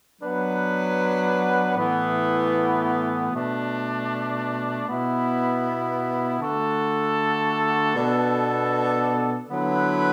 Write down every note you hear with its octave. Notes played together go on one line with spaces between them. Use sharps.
F#3 B3 D4 B4
A2 E3 B3
B2 A3 D4
B2 B3 E4
D3 A3 F#4 A4
B2 B3 D4 A4
D3 F#3 B3 E4 B4